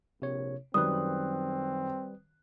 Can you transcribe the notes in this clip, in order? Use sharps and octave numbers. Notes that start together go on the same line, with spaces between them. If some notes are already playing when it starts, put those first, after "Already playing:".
A#1 C3 C#5
F#2 D#3 G3 C4 B4 D#6 F#6